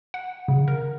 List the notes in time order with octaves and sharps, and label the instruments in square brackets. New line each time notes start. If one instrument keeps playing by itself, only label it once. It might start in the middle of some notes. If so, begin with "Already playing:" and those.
[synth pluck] F#5
C#3
A#4